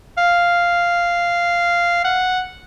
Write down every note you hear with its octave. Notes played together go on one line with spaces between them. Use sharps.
F5
F#5